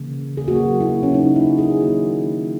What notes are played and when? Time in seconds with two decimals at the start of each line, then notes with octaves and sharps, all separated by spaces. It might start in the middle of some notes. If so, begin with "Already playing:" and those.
Already playing: C#3 E3 A#3
0.37 G#4
0.48 C#3 F#3 A#3 F#4
0.80 E4
1.03 C#4
1.14 C#3 F#3 A#3 D#4
1.36 E4
1.58 G#4
1.80 D#3 F#3 A#3 F#4